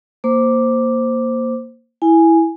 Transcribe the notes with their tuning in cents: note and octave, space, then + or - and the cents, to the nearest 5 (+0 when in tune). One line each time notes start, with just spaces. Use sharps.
A#3 +0 C5 +0 D6 +0
E4 +0 G#5 +0